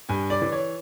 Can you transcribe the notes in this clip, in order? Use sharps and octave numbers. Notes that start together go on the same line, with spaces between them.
G2 G#5
D5
E3
C#5